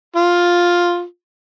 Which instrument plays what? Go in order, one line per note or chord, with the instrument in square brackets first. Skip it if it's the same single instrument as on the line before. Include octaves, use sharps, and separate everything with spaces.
[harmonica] F4